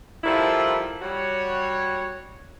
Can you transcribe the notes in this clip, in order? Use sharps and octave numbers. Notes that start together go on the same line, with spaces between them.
D#3 F3 G3 E4 F4 A4
G3 F#4 C#5